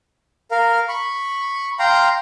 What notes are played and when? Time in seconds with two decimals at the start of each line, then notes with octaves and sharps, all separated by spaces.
0.51 A#4 F5
0.88 B5 C#6
1.79 F5 G5 A#5 C6